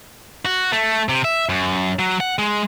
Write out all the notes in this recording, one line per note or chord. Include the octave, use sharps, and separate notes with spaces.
F#4
A3
C3
E5
F#2
F#3
F#5
G#3